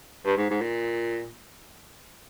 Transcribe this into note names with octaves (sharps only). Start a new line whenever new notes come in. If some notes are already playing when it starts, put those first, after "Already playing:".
G2
G#2
G#2
A#2